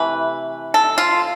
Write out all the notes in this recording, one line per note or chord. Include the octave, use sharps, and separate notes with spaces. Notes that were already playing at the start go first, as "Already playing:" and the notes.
Already playing: C3 E3 A3 B4
A4
F4